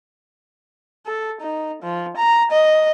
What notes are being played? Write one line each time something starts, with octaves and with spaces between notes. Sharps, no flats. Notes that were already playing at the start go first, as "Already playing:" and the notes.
A4
D#4
F3
A#5
D#5